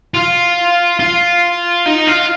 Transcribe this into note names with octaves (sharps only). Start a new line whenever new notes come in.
F4
F4
D#4
F4